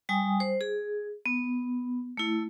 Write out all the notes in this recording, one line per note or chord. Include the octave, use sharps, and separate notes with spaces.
G3 G5 G#5 D#6
C5
G#4
B3
A3 E4